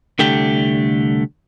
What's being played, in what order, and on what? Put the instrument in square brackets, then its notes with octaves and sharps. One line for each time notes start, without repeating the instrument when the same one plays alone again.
[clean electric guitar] C2 D3 A3 G4